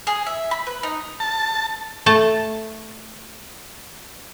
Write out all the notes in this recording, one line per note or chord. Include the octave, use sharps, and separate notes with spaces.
G#4
E5
B5
B4
D#4
A5
A3 A5